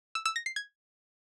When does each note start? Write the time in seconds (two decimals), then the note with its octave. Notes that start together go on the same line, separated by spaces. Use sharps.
0.15 E6
0.25 E6
0.36 A#6
0.46 C7
0.56 G#6